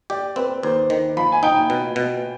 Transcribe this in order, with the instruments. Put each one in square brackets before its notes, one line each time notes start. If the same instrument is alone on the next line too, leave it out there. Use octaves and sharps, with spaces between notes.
[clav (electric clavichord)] G4 [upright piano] D5
[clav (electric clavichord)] C4 [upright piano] B4
[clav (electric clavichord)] D#2 [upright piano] C5
[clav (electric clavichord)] D#3
[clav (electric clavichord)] F3 [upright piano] B5
[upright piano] G#5
[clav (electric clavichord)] D#4 [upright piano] G5
[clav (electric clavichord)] B2
B2